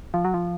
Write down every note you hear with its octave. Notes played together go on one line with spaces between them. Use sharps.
F3
F#3
F3